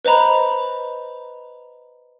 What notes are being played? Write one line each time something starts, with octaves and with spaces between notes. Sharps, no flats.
B4 C5 D#5 A#5 B5